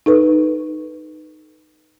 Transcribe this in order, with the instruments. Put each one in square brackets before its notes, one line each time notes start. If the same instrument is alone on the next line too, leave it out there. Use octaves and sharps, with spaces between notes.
[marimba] D#4 A4 B4